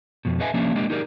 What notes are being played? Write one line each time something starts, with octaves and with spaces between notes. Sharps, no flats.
F2 B2
G#4 B4 D#5 E5 G#5
F3 A#3 C#4 D4 G4 E5
G#3 A#3 D4 G4 D#5
D#4 G4 G#4 A#4 C5 D5